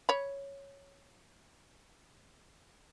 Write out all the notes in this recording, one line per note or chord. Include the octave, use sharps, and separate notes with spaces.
C#5 B5